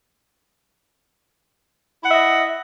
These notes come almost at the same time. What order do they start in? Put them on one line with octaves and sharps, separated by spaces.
E4 F#5 E5 D#5